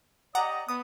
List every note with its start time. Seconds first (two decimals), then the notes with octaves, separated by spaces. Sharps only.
0.35 G4 D5 D#5 F#5 A#5 D6
0.69 B3 D#6